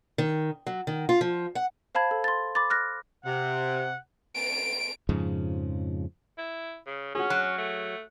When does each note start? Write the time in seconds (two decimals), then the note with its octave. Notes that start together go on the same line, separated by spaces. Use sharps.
0.18 D#3
0.67 F#3
0.87 D#3
1.09 F4
1.21 F3
1.55 F#5
1.95 C5 F5 A5 B5 G#6
2.11 A4
2.24 C6 A6
2.55 B5 D6 A6
2.70 F6 F#6 A#6
3.25 C3 F#5
4.36 D7
5.09 F2 G#2 C#3 F3
6.38 E4
6.87 C#3
7.15 C#4 F#4 G#4
7.30 F#3
7.58 A3